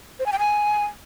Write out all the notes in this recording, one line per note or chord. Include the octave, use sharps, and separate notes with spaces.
C5
G#5
G5
G#5